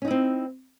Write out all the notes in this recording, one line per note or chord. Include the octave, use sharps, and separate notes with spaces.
C4 C#4 D#4 E4